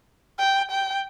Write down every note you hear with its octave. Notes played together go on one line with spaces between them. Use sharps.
G5
G5